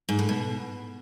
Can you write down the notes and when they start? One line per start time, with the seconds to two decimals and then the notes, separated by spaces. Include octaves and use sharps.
0.09 G#2
0.19 A2
0.29 B2